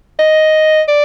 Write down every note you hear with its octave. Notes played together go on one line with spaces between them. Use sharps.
D#5
D5